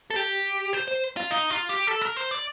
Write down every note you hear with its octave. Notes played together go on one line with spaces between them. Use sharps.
A4
G4
C5
C5
F4
D#4
F4
G4
A4
A#4
C5
D5